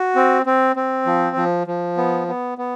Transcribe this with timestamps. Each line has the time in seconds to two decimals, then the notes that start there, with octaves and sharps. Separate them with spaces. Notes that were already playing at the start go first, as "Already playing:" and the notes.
Already playing: F#4
0.16 C4
0.46 C4
0.76 C4
1.06 F3
1.36 F3
1.67 F3
1.97 B3
2.28 B3
2.58 B3